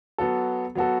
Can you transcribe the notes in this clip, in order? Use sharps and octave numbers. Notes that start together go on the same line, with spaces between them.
F#3 B3 F#4 A4
F#3 B3 F#4 A4